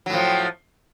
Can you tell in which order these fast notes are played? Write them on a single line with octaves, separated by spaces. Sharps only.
F#3 A2 F3